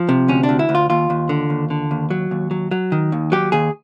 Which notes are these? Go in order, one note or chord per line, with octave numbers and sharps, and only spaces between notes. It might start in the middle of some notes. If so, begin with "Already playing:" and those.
Already playing: F3
C3
D2 C#4
D4
D2
E4
D2
F4
D#2 F4
D#2
D3
D#2
D3
D#2
F#3
D#2
F#3
F#3
D#3
D#2
F#3 G4
D#2 G#4